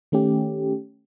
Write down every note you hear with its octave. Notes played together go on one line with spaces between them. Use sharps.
D#3 A3 C#4 G4